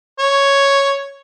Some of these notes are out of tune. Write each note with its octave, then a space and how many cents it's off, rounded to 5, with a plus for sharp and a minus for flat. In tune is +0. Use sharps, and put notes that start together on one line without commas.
C#5 +0